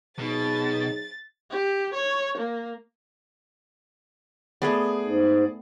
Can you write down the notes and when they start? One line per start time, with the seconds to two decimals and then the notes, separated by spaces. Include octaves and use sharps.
0.19 B2 F#3 D#4 G#4 A6
1.50 G4
1.94 C#5
2.38 A#3
4.62 A3 B3 G#4 D5
5.03 G#2